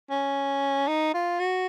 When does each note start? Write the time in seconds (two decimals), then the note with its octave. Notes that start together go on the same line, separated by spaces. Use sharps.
0.11 C#4
0.88 D#4
1.14 F4
1.40 F#4